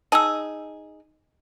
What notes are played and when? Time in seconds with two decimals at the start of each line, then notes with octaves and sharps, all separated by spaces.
0.12 D#4 G#4 A5 E6